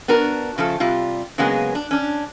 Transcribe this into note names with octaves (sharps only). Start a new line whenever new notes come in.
B3 D4 F#4 A#4
C#3 F3 A3 A4
C3 G3 F4
C#3 F#3 G#3 A#3 B3 G#4
D4
C#4 D4